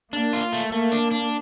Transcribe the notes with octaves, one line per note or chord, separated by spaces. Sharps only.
A#3 D4
F4
A3
A3 A#3
D4
D4